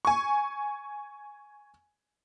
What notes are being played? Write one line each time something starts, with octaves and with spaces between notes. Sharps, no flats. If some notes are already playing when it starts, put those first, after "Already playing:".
G#5 C#6